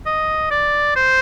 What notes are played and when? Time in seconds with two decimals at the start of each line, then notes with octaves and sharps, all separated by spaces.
0.06 D#5
0.51 D5
0.96 C5